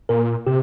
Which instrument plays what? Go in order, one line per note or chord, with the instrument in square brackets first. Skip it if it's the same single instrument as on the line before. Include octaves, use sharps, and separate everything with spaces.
[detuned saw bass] A#2 [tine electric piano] A#4
[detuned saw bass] C3 [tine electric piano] G4